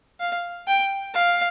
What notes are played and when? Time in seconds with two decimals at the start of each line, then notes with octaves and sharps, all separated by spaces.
0.20 F5
0.67 G5
1.14 F5